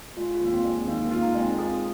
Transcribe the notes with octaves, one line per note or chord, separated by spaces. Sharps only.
G#3 F4
F4
D#2 A#3
C4
G#3
D#3 A#3
A#3
F4
D#4
G#3
C4
F4 G#4